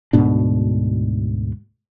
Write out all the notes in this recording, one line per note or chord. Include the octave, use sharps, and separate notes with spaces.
D2 G#2 B2 D4